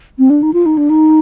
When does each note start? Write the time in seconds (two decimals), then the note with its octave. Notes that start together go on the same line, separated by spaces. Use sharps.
0.18 C4
0.30 D4
0.42 D#4
0.53 F4
0.66 D#4
0.77 D4
0.90 D#4